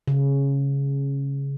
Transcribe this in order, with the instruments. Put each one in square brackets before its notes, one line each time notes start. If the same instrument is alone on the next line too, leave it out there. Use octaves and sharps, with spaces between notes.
[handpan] C#3